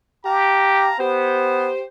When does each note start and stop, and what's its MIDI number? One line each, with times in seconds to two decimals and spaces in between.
0.25 0.91 67
0.25 0.98 77
0.25 0.98 81
0.25 0.98 82
0.99 1.70 59
0.99 1.83 67
0.99 1.83 72